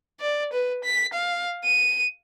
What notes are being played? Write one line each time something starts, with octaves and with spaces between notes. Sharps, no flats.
D5
B4
B6
F5
D#7